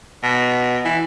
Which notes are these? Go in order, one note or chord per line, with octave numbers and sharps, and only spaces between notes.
B2
E3